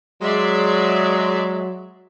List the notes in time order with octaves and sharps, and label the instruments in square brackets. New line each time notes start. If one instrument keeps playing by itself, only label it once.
[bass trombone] F#3 [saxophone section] G#3 [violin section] D5 E5 C6